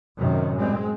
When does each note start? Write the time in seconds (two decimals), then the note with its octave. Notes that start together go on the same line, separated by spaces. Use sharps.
0.18 F#2 A2 C3 D#3
0.57 G#3 C4